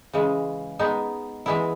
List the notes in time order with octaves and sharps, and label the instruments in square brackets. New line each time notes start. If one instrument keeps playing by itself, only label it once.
[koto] C#3 E3 G#3
G#3 B3 D#4
E3 G#3 B3 E4